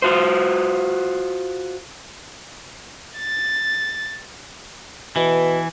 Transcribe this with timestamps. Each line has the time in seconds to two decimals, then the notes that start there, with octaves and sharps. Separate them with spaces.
0.02 F4 F#4 C5
3.19 A6
5.16 B2 E3